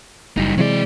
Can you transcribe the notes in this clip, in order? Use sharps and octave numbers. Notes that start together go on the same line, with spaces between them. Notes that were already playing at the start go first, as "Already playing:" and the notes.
F#1 G3 D#4
C3 E3 F#3 G#3 D5